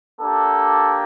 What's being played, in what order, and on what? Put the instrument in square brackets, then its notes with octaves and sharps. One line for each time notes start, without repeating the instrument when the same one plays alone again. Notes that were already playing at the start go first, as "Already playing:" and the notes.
[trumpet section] A#3 D4 G4 A4